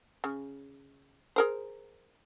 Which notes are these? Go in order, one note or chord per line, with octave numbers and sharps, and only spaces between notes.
C#3
G#4 A#4 C5